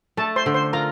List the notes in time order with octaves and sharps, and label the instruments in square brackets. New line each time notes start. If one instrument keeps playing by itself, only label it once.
[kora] A3 [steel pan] A4 A5
[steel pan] C5 C6
[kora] D3
[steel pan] C5 C6
[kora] F4 [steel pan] A#4 A#5